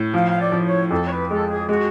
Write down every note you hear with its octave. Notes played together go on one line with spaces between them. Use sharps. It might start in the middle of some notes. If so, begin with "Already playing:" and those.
Already playing: A2
F3 F5
F5
D5
F3
C#5
F2 A4
C#5
B4
G#3 A4
G#4
G#3 F#4